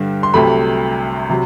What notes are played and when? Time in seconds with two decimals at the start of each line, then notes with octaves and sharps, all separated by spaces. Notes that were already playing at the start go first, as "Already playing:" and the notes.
Already playing: G2 D3 G3
0.23 C6
0.34 C2 C3 F#3 A3 B5
1.30 C3 F#3